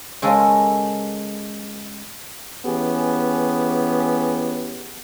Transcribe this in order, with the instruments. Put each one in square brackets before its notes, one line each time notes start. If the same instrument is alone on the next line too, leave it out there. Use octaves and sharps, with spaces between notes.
[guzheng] C#3 G#3 C#4 A4 A#4
[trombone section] E3 B3 C#4 G4 G#4